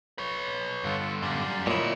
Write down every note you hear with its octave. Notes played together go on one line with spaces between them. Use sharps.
B4 C#5
G2 D3 F4 A4 F#5
F#2 G3 D5 F5 C6
D2 A#2 D#4 E4 C#5 D#5